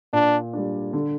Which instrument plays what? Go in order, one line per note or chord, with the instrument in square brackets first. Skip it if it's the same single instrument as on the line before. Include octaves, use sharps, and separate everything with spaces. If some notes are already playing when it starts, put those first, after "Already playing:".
[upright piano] A#2 [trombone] D4
[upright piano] G3 D4
D3